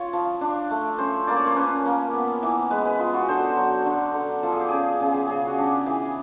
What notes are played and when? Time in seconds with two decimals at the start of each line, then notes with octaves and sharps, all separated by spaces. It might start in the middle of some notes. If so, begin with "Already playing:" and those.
Already playing: F4 C#5
0.13 F3
0.41 D4
0.71 A3
0.98 C#4 C5
1.27 A#3 D5
1.37 C#5
1.46 C5
1.56 C#4 B4
1.86 A#3
2.13 B3
2.43 E3
2.71 G#3 B4
2.85 B4
2.99 B3 F4
3.14 F#4
3.29 D3 C5
3.57 F#3
3.86 D3
4.15 D3
4.43 F3 A4
4.52 G#4
4.61 G4
4.69 C#4 G#4
5.00 C#3 G#4
5.14 G4
5.27 C#3 G#4
5.47 F#4
5.58 D4 G4
5.86 E3 G#4